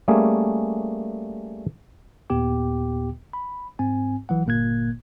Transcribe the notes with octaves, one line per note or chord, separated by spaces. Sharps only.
G3 A3 A#3 C#4 G#4
D#2 A#2 B3 G4 G5 D6
B5
G#2 C4 G#5
G1 E3 F#3 F#5
G1 A#2 A#3 F#6 G#6